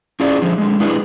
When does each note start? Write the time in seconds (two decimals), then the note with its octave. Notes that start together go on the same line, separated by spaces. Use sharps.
0.20 C#4 E4 F4 G#4 D5
0.42 D3 F3
0.58 D3 G#3
0.80 G3 D4 E4 G#4 B4